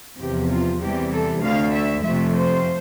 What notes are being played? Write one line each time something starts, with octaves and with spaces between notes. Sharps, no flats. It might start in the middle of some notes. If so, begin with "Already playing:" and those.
E2 C3 F3 G4
F4
E2 C3 E3 G3 G4
A4
D2 D3 A3 F5
E5
F2 C3 F3 A3 E5
C5